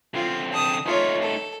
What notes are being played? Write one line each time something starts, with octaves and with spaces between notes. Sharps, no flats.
D3 C4 F4
A5 D#6
A3 D#4 F4 C#5
A4